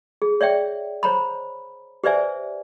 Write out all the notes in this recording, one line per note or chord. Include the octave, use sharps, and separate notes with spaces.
G#4
C#5 D5 E5 G5
C5 C#5 A#5 B5
G4 B4 C5 D5 E5 G#5